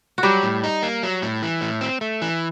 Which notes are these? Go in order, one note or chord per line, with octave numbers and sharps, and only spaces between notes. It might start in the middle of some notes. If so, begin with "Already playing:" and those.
F#4
F#3 G3 G4
A2
D#4
A#3
F#3
A2
E3
A2
C4
A3
E3